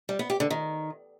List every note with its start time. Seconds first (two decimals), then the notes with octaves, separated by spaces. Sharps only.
0.09 G3
0.19 B3
0.30 G4
0.40 D3
0.50 D#3